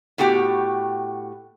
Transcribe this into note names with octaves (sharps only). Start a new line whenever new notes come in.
A2 B3 F#4 G4 G5